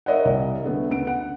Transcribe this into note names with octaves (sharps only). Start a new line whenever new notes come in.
A#4 C#5 D#5 E5 F#5
C2
D3 A3 B3
D2 C#3 B3 D7
F#5